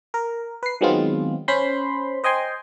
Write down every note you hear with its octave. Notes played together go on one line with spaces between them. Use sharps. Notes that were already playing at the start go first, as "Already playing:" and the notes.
A#4
B4 C7
D#3 F#3 G#3 B3 C4 F4
C#4 C5 B5 C6
C5 D#5 G5 G#5 C6